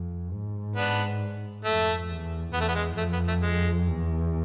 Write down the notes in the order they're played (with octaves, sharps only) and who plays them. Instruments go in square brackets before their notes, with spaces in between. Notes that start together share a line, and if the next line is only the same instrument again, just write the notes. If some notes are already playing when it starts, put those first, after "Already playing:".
Already playing: [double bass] F2
G#2
[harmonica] B3 D4
[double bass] F2 [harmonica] A3
[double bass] E2
[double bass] E2 [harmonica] B3
[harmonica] A3
B3
G#3
[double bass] F2 [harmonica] A3
[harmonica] B3
A3
G#3
[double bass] E2